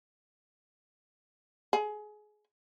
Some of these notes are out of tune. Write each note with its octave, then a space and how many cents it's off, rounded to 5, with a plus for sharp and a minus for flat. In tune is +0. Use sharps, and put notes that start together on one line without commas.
G#4 +25